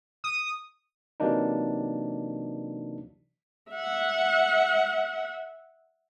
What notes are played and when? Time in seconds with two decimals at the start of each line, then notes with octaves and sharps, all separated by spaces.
0.24 D#6
1.20 C3 E3 F#3 A#3 D4 D#4
3.72 E5 F#5